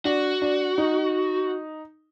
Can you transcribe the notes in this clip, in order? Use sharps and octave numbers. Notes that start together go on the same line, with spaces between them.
D4 F#4
D4
D#4